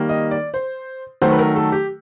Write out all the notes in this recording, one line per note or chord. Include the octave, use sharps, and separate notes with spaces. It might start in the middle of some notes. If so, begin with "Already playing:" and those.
Already playing: D#3 G3 A#3
D#5
D5
C5
D#3 F#3 A3 C5
B4
A#4
A4
G4